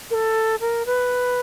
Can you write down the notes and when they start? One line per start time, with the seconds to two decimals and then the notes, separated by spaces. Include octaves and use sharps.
0.11 A#4
0.14 A4
0.60 A#4
0.86 B4